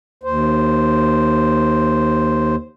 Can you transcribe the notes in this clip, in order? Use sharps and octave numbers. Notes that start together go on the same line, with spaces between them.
D#2 C5